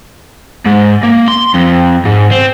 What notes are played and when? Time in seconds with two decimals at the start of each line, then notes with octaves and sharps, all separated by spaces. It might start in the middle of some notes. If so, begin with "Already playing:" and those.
0.66 G#2
1.03 A#3
1.28 C6
1.54 F2
2.05 G#2
2.31 C4